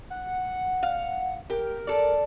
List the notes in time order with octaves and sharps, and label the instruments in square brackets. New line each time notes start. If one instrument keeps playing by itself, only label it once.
[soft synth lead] F#5
[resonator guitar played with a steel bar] F5
[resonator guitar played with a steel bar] G4 [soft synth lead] A#4
[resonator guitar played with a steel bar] A4 D5